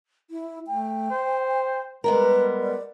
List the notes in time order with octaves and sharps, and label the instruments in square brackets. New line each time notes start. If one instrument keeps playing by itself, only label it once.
[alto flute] E4
[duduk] A3 [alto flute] G5
[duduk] C5
[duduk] G3 [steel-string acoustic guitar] G#3 B3 A#4 [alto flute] B4
[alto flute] D5